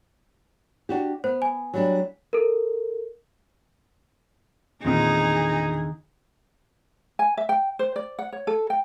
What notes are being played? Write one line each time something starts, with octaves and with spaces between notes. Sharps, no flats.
D4 F#4 G4
B3 C5
G#5
F#3 G3 D4
A4 A#4
E2 A#2 D3 D#3 C4 D#4 G#4 D#6
G#5
E5
G5
C5
D5
F#5
C#5
A4
G5